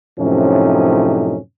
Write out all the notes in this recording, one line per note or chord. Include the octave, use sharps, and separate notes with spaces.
F#2 A2 C3 F3 C#4 D#4